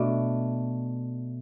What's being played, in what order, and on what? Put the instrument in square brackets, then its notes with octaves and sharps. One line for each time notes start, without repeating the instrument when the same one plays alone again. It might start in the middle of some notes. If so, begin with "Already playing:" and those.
Already playing: [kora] B2 A3 D4